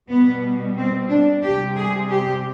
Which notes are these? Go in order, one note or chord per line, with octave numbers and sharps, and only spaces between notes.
B2 G3 B3
C4
D4
C3 G3 G4
G#4
G4